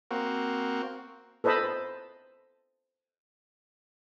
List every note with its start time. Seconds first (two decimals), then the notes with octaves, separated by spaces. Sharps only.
0.11 A#3 C4 F#4
1.44 A4 B4 C5 D#5 A5 B5